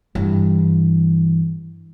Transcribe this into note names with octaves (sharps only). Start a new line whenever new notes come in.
G2 E3